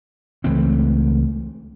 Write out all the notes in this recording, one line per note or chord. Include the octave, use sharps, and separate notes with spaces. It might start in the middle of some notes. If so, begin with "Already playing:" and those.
C#2 E3 A3 C4